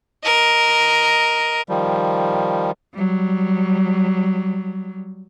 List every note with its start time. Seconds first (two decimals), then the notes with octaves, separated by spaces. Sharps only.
0.23 A#4 D#5
1.69 D#3 F3 G3
2.93 F#3 G3